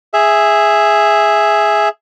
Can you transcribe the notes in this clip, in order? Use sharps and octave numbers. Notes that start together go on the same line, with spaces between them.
G#4 E5